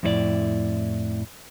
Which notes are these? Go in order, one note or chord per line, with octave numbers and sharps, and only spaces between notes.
F2 A2 E4 A4 D5